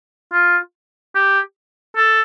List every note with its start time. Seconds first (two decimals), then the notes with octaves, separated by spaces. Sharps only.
0.33 F4
1.15 G4
1.97 A4